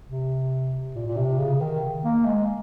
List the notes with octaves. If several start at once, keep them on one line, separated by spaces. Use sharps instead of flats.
C3
A#2
A#2
C3
C#3
D#3
A#3
G#3